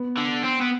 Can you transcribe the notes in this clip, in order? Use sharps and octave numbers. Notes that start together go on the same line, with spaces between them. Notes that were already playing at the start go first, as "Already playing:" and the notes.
Already playing: B3
D3
C4
B3